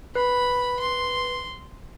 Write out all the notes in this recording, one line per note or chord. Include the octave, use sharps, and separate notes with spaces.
B4 B5
C6